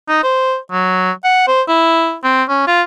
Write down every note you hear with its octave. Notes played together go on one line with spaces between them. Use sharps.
D#4
C5
F#3
F#5
C5
E4
C4
C#4
F4